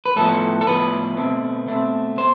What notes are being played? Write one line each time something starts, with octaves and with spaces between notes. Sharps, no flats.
B4
A2 F3 B3 A4
A4
A2 F3 B3 B4
B2 A3 C4
B2 A3 C4
B2 C5